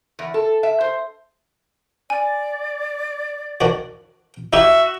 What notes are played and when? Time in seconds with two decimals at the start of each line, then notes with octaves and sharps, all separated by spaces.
0.19 E2
0.34 A4
0.63 E5
0.81 C5
2.10 D5 G#5
3.61 D#3 D4 F#4
4.53 D#4 E4 F#4 G4 E5